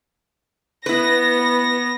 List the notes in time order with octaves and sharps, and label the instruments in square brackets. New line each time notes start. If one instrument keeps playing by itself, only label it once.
[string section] B3 A#6 [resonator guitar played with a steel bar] E4 B4